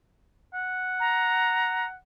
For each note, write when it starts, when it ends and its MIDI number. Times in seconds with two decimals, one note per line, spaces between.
0.54 1.96 78
1.00 1.86 82